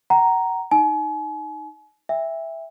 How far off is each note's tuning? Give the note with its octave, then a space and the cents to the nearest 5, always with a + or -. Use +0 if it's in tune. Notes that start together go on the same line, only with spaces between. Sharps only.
F#5 +30 A#5 +0
D#4 +0 G#5 +40
E5 +0 G5 +45